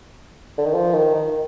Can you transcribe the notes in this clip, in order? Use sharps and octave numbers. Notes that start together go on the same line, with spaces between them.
D3
D#3
F3
D#3
D#3